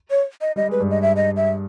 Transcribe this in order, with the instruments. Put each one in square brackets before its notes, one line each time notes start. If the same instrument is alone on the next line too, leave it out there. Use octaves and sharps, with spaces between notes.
[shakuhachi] C#5
D#5
[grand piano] G3 [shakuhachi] D#5
[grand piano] G#3 [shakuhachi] B4
[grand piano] G2 G3
[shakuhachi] D#5
E5
D#5
E5